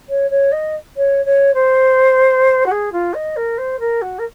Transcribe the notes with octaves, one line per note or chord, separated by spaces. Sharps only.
C#5
C#5
D#5
C#5
C#5
C5
F#4
G#4
F4
D#5
A#4
C5
A#4
F#4
A#4